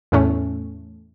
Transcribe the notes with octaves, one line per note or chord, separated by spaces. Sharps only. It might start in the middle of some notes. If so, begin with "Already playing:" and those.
E2 A2 A3 C#4